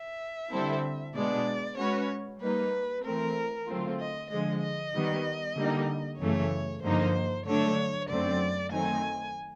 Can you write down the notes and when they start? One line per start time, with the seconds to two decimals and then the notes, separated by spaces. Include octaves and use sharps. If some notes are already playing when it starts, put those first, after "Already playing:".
Already playing: E5
0.52 D3 G3 C4 E4 A4
1.15 B2 G#3 B3 D4 D5
1.78 G#3 C#4 F#4 B4 C#5
2.41 G3 A#3 D#4 B4
3.04 E3 A3 C4 A#4
3.68 D3 F#3 A3 C4 F4
4.00 D#5
4.31 D3 F3 G#3 D#5
4.63 D#5
4.94 D#3 G3 B3
5.57 D3 G3 A#3 D#4
6.20 F#2 C#3 E3 A3 C#5
6.83 G2 D3 F3 A#3 D#4 C5
7.46 D3 F#3 A3 D4 C#5
8.09 F#2 D3 F#3 A3 C4 D5
8.72 D#3 F#3 A3 C4 D#4 G#5